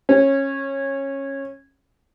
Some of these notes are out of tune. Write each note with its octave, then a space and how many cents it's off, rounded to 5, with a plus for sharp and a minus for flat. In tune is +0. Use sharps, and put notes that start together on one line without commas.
C#4 -20